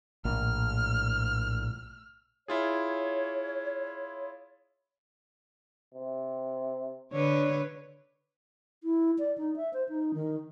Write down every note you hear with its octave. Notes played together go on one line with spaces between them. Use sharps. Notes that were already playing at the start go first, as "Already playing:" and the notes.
A#1 A2 F6
E4 F4 G#4 C#5
C3
D3 D4 B4 C#5
E4
D5
D#4
E5
C5
D#4
D#3